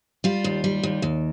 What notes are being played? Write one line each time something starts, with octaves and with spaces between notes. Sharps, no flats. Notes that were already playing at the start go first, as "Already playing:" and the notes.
G3 F4
D#2
G3
D#2
D#2